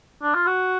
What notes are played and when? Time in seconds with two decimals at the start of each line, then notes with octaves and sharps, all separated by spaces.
0.22 D4
0.34 F4
0.47 F#4